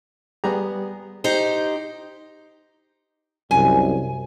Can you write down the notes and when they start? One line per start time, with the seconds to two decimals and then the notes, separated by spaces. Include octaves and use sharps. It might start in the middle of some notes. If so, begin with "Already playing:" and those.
0.44 G3 B3 G4 G#4 A#5
1.24 D#4 G4 C5
3.51 C2 F#2 G#5